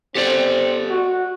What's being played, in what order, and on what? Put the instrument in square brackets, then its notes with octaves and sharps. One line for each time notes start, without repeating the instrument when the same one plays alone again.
[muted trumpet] C4 [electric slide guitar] G4 A4 D5
[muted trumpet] F#4